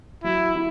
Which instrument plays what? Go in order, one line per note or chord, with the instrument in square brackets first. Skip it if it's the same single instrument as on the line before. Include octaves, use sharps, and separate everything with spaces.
[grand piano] F#3 [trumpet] E4
[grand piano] E4